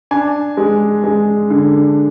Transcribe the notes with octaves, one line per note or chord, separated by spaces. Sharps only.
D4 G#5
G#3
G#3
D3